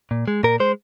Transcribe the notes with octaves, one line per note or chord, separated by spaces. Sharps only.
A#2
G#3
A#2 A#4
G#3 C5